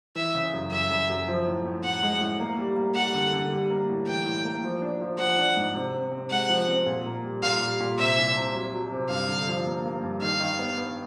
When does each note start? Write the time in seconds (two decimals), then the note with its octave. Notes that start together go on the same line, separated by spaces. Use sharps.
0.16 E3 E5
0.35 C#3
0.53 F#2
0.71 F#2 E5
0.91 F#2
1.10 F#2
1.28 F3
1.47 A2
1.65 A2
1.84 A2 F#5
2.03 G#3
2.21 A2
2.40 A#3
2.59 G3
2.76 A#3
2.95 G3 F#5
3.15 D3
3.33 D3
3.52 G3
3.70 A#3
3.89 A2
4.07 E3 G5
4.25 A2
4.45 A#3
4.64 F3
4.82 D4
5.01 F3
5.19 F3 F#5
5.38 D4
5.57 G#2
5.75 C3
5.94 C3
6.12 C4
6.31 G#3 F#5
6.50 F3
6.68 C4
6.86 A#2
7.06 A#3
7.24 G3
7.43 A#2 F5
7.62 G3
7.81 A#2
7.98 C3 E5
8.18 C2
8.37 C3
8.55 F#3
8.73 F#3
8.92 C3
9.10 G2 F5
9.29 D3
9.48 F3
9.67 A#3
9.86 A#3
10.03 G2
10.22 D#3 F5
10.40 D#3
10.59 B3
10.78 B3